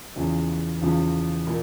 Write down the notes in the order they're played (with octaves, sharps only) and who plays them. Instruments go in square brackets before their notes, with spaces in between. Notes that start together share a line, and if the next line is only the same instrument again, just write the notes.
[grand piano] E2 C#3 F3
E2 C#3 F3
A#2